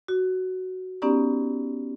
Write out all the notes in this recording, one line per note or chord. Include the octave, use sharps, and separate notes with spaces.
F#4
B3 C#4 D#4 G4 D5 A#5